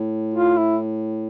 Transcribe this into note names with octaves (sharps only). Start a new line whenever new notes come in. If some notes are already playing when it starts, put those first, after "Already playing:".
Already playing: A2
F4
E4